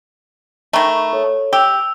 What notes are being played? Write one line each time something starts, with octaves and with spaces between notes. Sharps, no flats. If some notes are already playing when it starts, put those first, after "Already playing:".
D#3 A3 A#5 B5 C#6
A4 C#5
G4 E6 F7